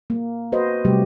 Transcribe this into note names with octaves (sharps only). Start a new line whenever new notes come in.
A#3
F#4 B4 C5 D#5
C3 F#3 G3 A3 G4